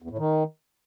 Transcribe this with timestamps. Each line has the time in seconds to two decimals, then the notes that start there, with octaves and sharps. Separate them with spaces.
0.02 E2
0.10 A2
0.19 D#3